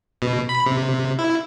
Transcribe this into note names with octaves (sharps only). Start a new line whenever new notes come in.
B2
B5
C3
E4